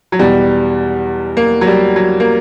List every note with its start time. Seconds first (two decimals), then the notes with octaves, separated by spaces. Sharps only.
0.12 F#3
0.19 E2 B2 G3
1.37 A#3
1.61 F#3
1.67 G3
1.96 F#3
2.20 A#3